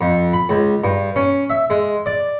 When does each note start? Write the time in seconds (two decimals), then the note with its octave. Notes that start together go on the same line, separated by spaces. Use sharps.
0.01 F2
0.33 B5
0.49 C#2
0.84 G2
1.16 C#4
1.50 E5
1.70 G#3
2.06 D5